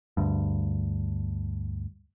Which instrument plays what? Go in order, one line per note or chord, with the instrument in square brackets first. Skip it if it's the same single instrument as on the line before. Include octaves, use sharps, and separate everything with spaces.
[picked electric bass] D2 G2